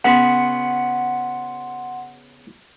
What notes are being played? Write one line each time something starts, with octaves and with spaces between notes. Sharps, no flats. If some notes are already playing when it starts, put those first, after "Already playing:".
C#3 B3 F#4 F#5 C6